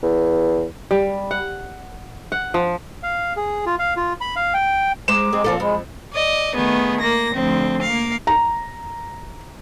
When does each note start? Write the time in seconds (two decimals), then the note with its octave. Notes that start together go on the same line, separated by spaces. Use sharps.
0.03 E2
0.91 G3
1.31 F#5
2.32 F#5
2.54 F3
3.03 F5
3.36 G#4
3.66 F4
3.79 F5
3.97 F4
4.21 B5
4.36 F5
4.54 G5
5.08 G#3 C5 A#5 D6 E7
5.33 G#3 C4 G#4
5.44 A#2 F3 C4 F4 A4
5.60 F2 G#3 B5
6.12 D5 D#5
6.55 D#3 A3 B3 G#4
6.99 A#3 A#6
7.32 D2 F3 C4
7.82 A#3 F5
8.27 A#5